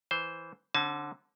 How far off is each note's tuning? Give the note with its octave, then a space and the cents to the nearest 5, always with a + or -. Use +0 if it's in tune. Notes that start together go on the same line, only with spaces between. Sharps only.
E3 +0 C5 +0
D3 +0 C#4 -45 A5 -40